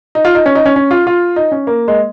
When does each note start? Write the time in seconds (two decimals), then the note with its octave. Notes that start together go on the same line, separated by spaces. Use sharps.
0.15 D#4
0.25 F4
0.35 D#4
0.46 C#4
0.55 D#4
0.66 C#4
0.76 C#4
0.91 F4
1.07 F4
1.36 D#4
1.52 C#4
1.67 A#3
1.88 G#3